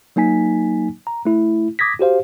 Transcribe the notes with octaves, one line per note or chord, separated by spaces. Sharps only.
F#3 A#3 D#4 G#5 B6
A#5
A3 E4
D6 D#6 G#6 A#6 B6
F#4 G4 C5 F5